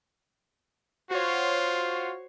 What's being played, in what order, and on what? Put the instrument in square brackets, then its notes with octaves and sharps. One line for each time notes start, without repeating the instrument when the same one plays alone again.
[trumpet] F4 [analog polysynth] F#4 C#5 [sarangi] C5